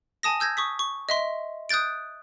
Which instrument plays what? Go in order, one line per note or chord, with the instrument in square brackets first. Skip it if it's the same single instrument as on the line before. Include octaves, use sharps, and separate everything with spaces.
[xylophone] G#5 A5 D#6 A#6
E6 G6 G#6 A#6
C#6 D#6 B6
C#6
D#5 E5 C6
D#6 F#6 G6 A6 D7